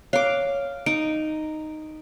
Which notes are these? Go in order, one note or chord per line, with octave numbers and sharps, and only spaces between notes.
C#5 F5 D6
D#4 D7